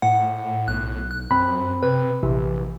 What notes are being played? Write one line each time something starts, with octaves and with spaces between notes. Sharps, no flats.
A2 F#5
B1 F#6
F#6
F#2 C4 B5
C3 B4
A#1 C3 E3